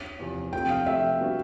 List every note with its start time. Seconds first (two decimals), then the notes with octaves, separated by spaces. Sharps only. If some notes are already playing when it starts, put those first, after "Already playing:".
Already playing: C#5
0.19 E2 C3 F3
0.53 C3 F3 A3 C4 G5
0.70 F5
0.86 C3 F3 A3 E5
1.20 G3 B3 D4 F#4